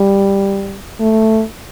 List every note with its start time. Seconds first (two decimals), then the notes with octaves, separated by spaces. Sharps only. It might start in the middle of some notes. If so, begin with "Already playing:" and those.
Already playing: G3
1.00 A3